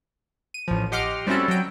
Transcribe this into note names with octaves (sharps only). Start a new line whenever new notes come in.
D#7
A1 F3
G4 D#5 F#5 C6 D6 F6
G3 C4 C#4 E4 F#4 A4
F#3 G5